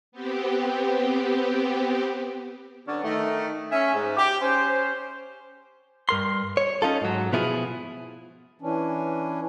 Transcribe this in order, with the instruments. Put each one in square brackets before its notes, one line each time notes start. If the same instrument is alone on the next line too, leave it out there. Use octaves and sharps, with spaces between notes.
[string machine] B3 C4 G4
[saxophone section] D3 F#3 B3 C#4 D4 C#5
D#3 A3
C#4 E5
G#2
G4
C#4 C5
[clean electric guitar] G2 A#4 C6
C#5
C#4 D#4 F4 A4
G#2 F#3
B2 F3 B3 E4 F4 G#4
[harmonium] E3 C#4 D4